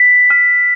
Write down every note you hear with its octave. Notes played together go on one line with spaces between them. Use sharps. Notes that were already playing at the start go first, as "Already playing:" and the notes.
Already playing: B6
F6